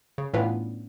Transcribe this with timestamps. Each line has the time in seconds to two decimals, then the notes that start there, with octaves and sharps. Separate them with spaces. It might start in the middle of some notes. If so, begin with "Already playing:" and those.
0.18 C#3
0.34 A2 E3 B3 C#4 D4 F4